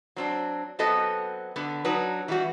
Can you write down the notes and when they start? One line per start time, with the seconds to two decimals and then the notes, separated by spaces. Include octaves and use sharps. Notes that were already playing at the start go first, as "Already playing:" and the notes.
0.16 F#3 C4 D4
0.79 F#3 B3 C4 A4 D#5
1.56 D3 B3
1.85 F#3 D4 D#4 B4
2.28 E3 G3 G#3 E4 F#4